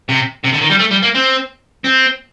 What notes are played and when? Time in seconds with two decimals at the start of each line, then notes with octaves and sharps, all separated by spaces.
0.09 C3
0.44 C3
0.53 D3
0.61 D#3
0.70 G3
0.79 A3
0.91 G3
1.02 A#3
1.14 C4
1.84 C4